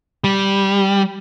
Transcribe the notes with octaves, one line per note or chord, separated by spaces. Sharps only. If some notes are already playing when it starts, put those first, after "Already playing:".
G3